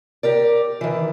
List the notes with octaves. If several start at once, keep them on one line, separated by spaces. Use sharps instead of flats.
G4 A#4 D5
D#3 E3